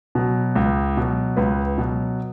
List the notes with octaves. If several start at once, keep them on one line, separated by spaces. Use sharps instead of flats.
B2 F#3
C#2
B2 F#3
C#2 B4
B2 F#3